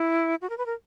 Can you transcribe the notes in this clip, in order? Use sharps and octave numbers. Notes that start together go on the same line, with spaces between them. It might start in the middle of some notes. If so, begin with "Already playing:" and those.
Already playing: E4
F#4
A#4
B4
A#4